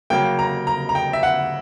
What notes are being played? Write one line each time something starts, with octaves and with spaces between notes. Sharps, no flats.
C#3 F#3 A#3 G5
A#5
A#5
A#5
G5
E5
F#5